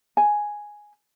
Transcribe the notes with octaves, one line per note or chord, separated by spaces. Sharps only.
G#5